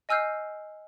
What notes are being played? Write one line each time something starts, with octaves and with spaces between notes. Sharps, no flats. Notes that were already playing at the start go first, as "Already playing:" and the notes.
D#5 G#5 E6 F6 G6 C7